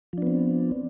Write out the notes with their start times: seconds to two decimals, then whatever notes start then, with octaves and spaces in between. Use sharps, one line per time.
0.13 F3
0.18 D4
0.22 B3
0.27 C4